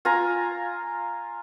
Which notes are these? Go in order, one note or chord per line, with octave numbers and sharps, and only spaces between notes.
F4 G#5 A#5